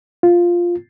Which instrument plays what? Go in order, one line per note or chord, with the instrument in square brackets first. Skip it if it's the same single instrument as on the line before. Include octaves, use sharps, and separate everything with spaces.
[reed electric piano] F4